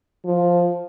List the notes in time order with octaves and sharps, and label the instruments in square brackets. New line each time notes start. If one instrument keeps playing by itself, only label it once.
[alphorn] F3